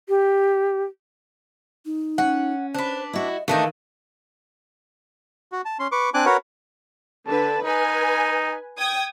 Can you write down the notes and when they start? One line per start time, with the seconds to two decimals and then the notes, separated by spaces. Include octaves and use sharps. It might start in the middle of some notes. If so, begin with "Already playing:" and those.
0.09 G4
1.86 D#4
2.18 C#4 F#5
2.75 D4 B4 C5
3.13 E4 F#4 D#5
3.48 D#3 E3 A3 D4 D#4 F5
5.52 F#4
5.65 A5
5.79 C#4 C6
5.92 B4 C#6 D6
6.14 C4 D4 G#5 D6 F#6
6.26 F#4 A#4 B4 C#5 F#5
7.27 D3 B4 A5
7.63 D#4 B4 G#5
8.78 G5 D#6 G#6